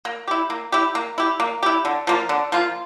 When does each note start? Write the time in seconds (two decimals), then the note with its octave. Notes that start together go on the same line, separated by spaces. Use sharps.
0.05 A#3
0.28 E4 G4
0.50 A#3
0.72 E4 G4
0.95 A#3
1.18 E4 G4
1.40 A#3
1.63 E4 G4
1.85 D3
2.07 F3 A#3 F4
2.29 D3
2.52 F3 A#3 F4